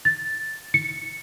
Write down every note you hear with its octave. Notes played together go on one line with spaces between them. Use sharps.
A6
C#7